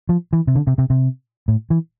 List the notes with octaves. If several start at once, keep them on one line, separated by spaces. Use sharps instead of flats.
F3
E3
C3
D3
C3
C3
C3
A2
E3